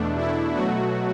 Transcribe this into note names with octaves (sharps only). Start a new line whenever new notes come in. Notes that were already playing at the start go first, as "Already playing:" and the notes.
Already playing: E2 B2 A3 D4
E4
B2 F#3 A3 F#4